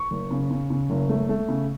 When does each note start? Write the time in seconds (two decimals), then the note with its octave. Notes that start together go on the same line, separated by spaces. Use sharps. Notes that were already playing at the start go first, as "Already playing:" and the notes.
Already playing: C#6
0.11 F#1
0.31 C#3
0.51 C#3
0.70 C#3
0.90 F#1
1.09 A3
1.29 A3
1.48 C#3